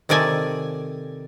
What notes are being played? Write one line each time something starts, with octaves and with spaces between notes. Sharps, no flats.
C3 D#3 A4 D5 G#5